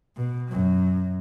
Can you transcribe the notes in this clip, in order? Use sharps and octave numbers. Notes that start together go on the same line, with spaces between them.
B2
F#2 F#3